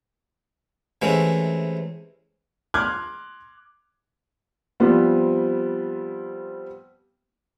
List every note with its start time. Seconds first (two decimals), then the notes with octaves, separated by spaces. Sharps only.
1.02 C3 E3 G#3 A3 C#4
2.74 C6 D6 F6 F#6 G#6
4.80 F3 G3 B3 C4